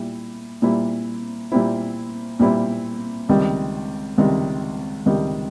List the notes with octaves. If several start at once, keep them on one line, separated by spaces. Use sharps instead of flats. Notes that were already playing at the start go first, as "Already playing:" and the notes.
Already playing: A#2 G3 E4
A#2 G3 C4 E4
A#2 G3 C4 E4
A#2 G3 C4 E4
C#2 C3 D#3 G3
C#2 C3 D#3 G3
C#2 C3 D#3 G3